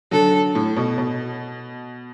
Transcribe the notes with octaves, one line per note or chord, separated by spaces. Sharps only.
D3 F#3 A4
A2
B2
B2